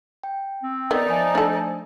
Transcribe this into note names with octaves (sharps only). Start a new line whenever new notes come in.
G5
C4
D#3 B3 D#4 D5
F3 E5 G#5 A#5
A3 D4 A4 G#5